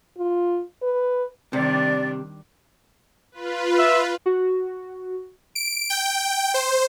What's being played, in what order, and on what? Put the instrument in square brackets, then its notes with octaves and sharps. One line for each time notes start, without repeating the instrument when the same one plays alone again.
[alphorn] F4
B4
[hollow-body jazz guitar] C3 [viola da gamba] D#3 G3 D4 [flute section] D5
[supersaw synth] F4 B4
[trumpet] E5
[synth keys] F#4
[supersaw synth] D7
G5
C5